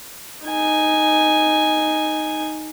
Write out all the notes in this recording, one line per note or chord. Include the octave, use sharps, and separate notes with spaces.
D#4 G#5